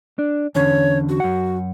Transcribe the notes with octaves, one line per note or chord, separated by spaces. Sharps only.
D4
E2 D3 C#4 C#5
F#4
F#2 F#5